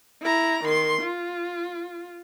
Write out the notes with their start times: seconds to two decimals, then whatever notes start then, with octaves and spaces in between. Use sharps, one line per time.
0.22 E4 A#5
0.64 D#3 C6
1.02 F4